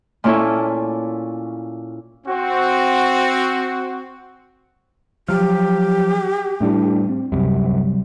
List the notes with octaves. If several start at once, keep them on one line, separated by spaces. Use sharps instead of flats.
A#2 A#3 C#4 E4 A4
C4 F#4
F3 F#3 G4 F6
A2 G3 A3 D4 E4
C4
D1 C2 F#2 C3 F#3 G3